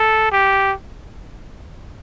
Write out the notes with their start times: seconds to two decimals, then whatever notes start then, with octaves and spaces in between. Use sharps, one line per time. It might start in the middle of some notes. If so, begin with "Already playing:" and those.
Already playing: A4
0.32 G4